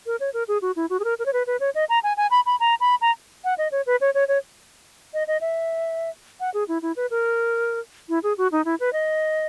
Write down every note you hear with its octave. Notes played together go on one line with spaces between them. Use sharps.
A#4
C#5
A#4
G#4
F#4
E4
F#4
G#4
A#4
A#4
C#5
B4
B4
C#5
D#5
A#5
G#5
G#5
B5
B5
A#5
B5
A#5
F#5
D#5
C#5
B4
C#5
C#5
C#5
D#5
D#5
E5
F#5
G#4
E4
E4
B4
A#4
E4
G#4
F#4
D#4
E4
B4
D#5